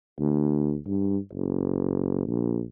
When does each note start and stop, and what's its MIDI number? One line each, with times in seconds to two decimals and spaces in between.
0.20 0.77 38
0.86 1.17 43
1.33 2.26 30
2.27 2.63 34